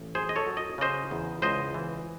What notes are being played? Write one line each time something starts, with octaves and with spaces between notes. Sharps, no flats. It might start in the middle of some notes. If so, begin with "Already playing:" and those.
Already playing: A1
F#2 G#4 C5
D#5
A4 C#5
F#3
D#5
C#3 C5 D#5
E2
C#2 C5 D#5
E3